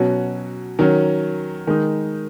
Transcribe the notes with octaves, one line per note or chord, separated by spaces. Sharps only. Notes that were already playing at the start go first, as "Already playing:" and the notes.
Already playing: B2 F#3 C#4 F#4
D#3 F#3 C#4
D#3 G#3 D#4